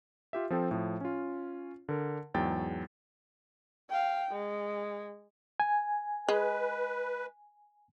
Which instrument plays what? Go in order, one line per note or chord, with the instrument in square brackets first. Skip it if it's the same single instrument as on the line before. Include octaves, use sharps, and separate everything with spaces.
[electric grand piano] F4 G4 E5
F3 C4 A4 G5
A2 F3
C#4 F4
D3 A#4
E2 G#2 F#3 G5 A6
[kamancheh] F5 G5
G#3
[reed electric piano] G#5
[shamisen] G#3 [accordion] B4